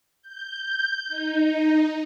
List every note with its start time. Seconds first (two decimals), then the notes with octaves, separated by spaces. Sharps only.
0.22 G6
1.08 D#4